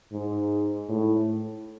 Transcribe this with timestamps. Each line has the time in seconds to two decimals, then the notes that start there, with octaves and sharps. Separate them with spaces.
0.12 G#2
0.89 A2